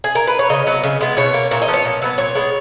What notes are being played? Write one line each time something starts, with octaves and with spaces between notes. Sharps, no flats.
G#4
A#4
B4
C#5
C#3 D#5
F#3 B3
C#3
G#3 B3
B2 C#5
A#3
A#2 C#5
D#5
F3 B3
C#5
A#2
F#3 B3
A#2 C#5
G#3 B3